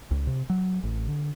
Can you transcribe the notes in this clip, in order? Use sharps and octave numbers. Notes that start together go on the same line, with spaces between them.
C#2
C3
F#3
A1
D3